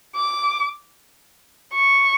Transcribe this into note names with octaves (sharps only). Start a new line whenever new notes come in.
D6
C#6